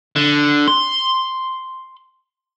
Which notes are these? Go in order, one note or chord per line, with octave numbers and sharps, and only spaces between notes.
D3
C6